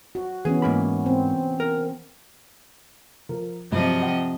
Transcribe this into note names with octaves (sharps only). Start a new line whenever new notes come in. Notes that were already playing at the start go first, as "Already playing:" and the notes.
F#4
E3 B3 C#4 G#4
G#2 A#3 B5
C4
A#4
F3 A#4
G2 C3 F3 F#3 D#5
F#5 G5